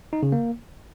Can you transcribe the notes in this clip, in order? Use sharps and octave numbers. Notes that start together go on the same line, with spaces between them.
D#4
C#3
A#3